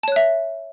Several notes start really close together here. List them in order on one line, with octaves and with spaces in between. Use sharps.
A5 C#5 F#6 E5